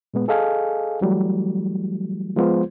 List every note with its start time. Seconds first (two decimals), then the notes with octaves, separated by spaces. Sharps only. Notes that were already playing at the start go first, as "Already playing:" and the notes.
0.14 A#2 G#3 B3
0.28 G#4 A4 D#5 F5 G#5
1.01 E3 F#3 G3 A3
2.36 F3 G#3 B3 F4 C5